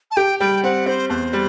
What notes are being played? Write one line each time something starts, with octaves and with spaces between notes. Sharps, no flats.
A5
G4 G5
G3 G5
C4 F#5
C4 C5
E2 C5
G3